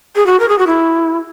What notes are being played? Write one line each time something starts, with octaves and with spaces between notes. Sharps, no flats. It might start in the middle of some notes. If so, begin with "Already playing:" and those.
G#4
F#4
A#4
G#4
F#4
E4